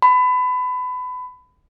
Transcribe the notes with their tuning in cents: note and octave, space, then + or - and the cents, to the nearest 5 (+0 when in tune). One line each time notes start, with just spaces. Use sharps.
B5 +25